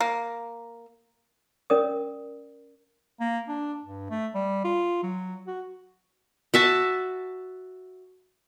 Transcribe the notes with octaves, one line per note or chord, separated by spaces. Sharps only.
A#3
C#4 A#4 D5 D#6
A#3
D4
G2
A3
G3
F4
F#3
F#4
F#4 E5 A5